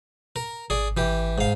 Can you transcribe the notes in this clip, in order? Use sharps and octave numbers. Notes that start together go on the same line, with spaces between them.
A#4
G#1 G#4 D5
E3 G4
G#2 F5